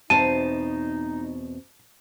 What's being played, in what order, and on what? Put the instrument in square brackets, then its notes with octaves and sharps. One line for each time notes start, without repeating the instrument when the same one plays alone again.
[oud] E2 B2 C4 [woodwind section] D#4 [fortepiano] A5 [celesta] D#7